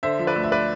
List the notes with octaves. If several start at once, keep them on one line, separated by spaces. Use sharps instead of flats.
D3 C5 E5
F3
B4 D5
D2
E5
B4 D5